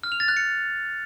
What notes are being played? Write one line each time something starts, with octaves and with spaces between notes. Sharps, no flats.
F6
F7
A6
F#6
C#7